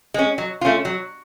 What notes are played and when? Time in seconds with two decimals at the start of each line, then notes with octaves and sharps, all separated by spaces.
0.14 G#3 C#4
0.38 F#3
0.61 A3 C#4 F4
0.85 F#3